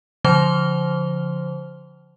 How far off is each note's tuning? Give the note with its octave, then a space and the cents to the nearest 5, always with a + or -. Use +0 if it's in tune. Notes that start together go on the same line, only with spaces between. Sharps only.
D3 -40 F3 +0 C5 +0